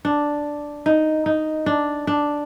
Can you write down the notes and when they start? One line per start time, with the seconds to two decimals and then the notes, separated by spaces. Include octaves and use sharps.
0.05 D4
0.86 D#4
1.26 D#4
1.66 D4
2.07 D4